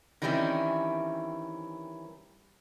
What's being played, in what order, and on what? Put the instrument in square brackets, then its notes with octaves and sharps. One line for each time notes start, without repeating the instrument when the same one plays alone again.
[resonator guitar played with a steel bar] D#3 E3 G3 C4 C#4 E4